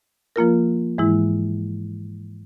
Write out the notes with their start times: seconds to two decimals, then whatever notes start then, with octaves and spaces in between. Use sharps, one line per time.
0.36 F3 A#3 F4 A#4
0.98 G#2 E3 G#3 E4